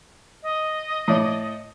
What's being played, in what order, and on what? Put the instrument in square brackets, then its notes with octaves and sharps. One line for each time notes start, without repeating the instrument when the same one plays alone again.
[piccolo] D#5
[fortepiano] A2 D5